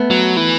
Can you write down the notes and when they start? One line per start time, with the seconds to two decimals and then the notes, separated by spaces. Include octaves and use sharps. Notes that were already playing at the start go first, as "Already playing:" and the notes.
Already playing: A3 B3
0.11 F#3
0.37 E3